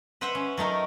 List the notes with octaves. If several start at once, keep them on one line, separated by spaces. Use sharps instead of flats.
B4 C5 E5 F#5 B5
C#4
F#3 A3 D#4 A#4